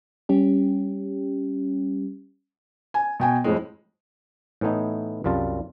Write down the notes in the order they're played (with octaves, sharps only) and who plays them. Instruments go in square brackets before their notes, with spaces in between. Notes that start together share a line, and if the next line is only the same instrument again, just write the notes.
[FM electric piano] G3 C#4 G4
[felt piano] G#5
B2 G5 G#5
F2 A2 G#3
[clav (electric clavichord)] A2 E3 A3 B3 D#4
C2 F#2 G3 F4 A5